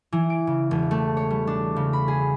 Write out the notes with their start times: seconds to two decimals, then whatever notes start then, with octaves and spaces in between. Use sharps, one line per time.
0.12 E3
0.30 D7
0.47 C#3
0.71 E1
0.91 A3
1.17 C#5
1.31 G3
1.47 D4
1.76 C#3
1.93 B5
2.08 G#4